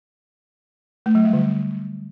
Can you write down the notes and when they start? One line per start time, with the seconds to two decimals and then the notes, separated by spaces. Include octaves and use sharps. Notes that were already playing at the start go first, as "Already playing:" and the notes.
1.06 A3
1.15 F#3
1.24 G3
1.33 D3